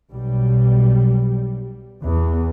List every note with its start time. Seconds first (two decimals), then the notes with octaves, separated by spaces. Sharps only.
0.11 B1 G3
2.03 E2